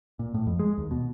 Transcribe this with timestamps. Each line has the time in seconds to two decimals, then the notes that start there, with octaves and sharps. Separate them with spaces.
0.19 A#2
0.34 A2
0.47 F2
0.59 G#3
0.78 D#2
0.91 B2